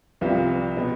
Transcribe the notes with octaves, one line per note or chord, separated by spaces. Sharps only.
C2 C3 F3 B3 F4
B2 B3